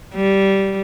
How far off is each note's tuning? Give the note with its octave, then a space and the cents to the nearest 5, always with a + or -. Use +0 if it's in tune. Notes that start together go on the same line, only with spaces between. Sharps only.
G3 -10